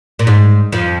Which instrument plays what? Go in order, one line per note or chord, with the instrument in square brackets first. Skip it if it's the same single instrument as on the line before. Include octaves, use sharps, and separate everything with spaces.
[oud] A#2
G#2
F2 F3